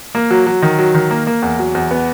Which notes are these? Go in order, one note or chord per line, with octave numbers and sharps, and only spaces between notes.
A#3
F#3
F#3
D#3
F#3
D#3
A#3
A#3
E2
F#3
E2
B3